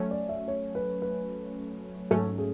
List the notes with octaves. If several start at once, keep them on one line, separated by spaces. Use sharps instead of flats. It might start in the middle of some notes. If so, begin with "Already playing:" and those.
Already playing: F#3 A3 C#4
D5
E5
C#5
B4
B4
G#2 F#3 A3 C#4 A4
G#4